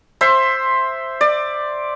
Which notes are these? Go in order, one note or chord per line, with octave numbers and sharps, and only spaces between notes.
C5 E5 C6
D5